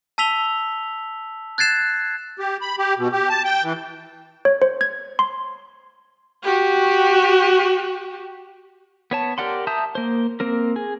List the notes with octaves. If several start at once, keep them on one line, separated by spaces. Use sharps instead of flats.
A5 E6 B6 F7 G7
F#6 G#6 A6 C7 E7
G4
B5
G4
B2
G4
A5
G5
E3
C#5
C5
G#6
C6
F#4 G4
B3 C#5 A5
G4 A#4 D5 F#5 C6
E5 A5 A#5 D#6 G6
A#3 C5
A#3 C4 A#4
G#4